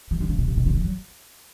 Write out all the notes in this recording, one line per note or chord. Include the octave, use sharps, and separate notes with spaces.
E3
D3
C#3
B2
C#3
B2
D3
E3
F#3